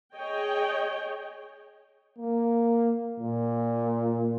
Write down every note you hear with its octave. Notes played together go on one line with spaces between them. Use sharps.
G#4 C#5 D#5 G5
A#3
A#2